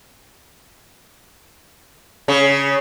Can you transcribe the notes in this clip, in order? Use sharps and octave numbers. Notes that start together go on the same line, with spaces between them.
C#3